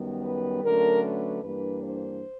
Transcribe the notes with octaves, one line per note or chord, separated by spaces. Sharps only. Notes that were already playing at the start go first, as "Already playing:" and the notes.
Already playing: F#2 D#3 G3 B3
B4
D3 F#3 A3 C#4 A#4
B4
G2 E3 G3 A#3 D4 B4
C5